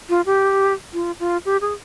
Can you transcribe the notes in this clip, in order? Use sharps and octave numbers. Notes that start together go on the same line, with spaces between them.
F4
G4
F4
F4
G4
G#4